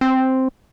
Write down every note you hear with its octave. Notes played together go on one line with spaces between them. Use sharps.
C4